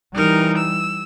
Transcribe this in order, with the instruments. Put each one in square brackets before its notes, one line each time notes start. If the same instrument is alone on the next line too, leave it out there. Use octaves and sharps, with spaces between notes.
[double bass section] E3 G3 [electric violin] D#4 A#4
[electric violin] E6